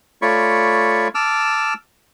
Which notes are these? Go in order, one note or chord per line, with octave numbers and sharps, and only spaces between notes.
A3 F4 C#5 D5 B5 C#6
A5 D6 E6 F6